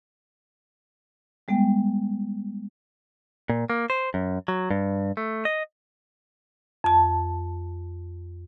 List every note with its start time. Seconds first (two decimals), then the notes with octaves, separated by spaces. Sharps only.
1.48 G3 G#3 B3 G5
3.50 A#2
3.70 A#3
3.90 C5
4.14 F#2
4.48 F#3
4.71 G2
5.17 A3
5.45 D#5
6.84 F2 A5